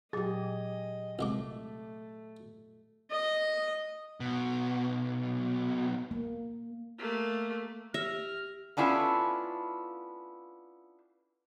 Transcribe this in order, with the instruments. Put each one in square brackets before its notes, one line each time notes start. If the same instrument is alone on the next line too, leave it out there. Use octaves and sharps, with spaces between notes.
[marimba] A#2 F#3 [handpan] G4 G#4 [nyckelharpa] D#5
[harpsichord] C2 G#3 D6 [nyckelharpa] A3
[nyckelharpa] D#5
[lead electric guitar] B1 B2
[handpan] A#3
[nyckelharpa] A3 A#3
[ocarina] G4 [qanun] E5 [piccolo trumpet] F6 [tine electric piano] A#6
[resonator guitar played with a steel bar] B3 C#4 D4 E4 F4 A4